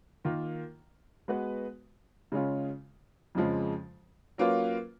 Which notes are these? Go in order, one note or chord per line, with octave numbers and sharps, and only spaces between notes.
D#3 A#3 F4
G#3 B3 F#4 B4
C#3 G#3 C#4 F4
F2 C#3 F3 G#3
F#3 A#3 C#4 F4 B4